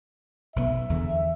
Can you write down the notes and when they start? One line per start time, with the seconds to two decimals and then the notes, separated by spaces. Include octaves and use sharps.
0.56 B1 F3 B3 E5
0.90 E2 D3